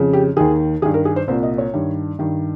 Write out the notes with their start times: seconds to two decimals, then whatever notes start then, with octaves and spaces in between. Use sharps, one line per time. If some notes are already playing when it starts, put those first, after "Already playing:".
Already playing: F2 C#3
0.13 G4
0.37 D#2 D#3 G#4
0.82 D#3 G#4
0.85 G2
0.94 A#4
1.05 G#4
1.16 C5
1.28 C2 A#2 C5
1.43 D#5
1.58 C#5
1.74 G2 D#3
2.19 G2 D#3